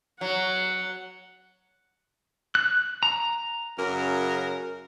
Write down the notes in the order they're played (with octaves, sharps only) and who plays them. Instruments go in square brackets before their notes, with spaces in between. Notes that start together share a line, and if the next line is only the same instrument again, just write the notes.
[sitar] F#3 [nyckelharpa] F#5
[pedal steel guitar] F#6
A#5
[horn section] F#2 C#3 A#4